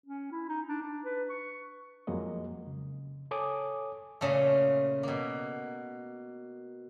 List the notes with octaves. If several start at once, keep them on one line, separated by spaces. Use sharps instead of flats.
C#4
E4
D#4
D4
D4
B4
C#6
F2 F#3 G#3 A#3 D#5
C#3
A4 C#5 G#5 D6 D#6
A#2 C#3 A3
B2 A#3